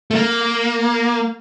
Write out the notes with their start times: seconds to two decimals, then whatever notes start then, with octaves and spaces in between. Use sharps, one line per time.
0.11 A3
0.15 A#3